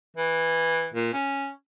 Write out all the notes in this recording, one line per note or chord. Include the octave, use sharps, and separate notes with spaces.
E3
A#2
C#4